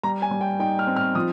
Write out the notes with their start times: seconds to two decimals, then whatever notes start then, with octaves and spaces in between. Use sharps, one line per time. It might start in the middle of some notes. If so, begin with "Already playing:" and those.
0.03 G3 A#5
0.22 G#5
0.31 G3
0.41 G5
0.59 D#4 G5
0.79 F6
0.87 C4
0.96 F6
1.15 F3 D#6